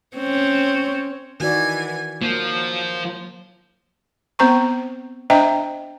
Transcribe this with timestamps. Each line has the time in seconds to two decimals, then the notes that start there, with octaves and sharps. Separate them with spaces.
0.16 C4 C#4
1.40 D#3 E3 F#4 D5 G#5
2.22 F3 F#3 A#3
4.39 B3 C4 C5 A#5 C#6
5.30 D4 C5 D#5 E5 G5 A#5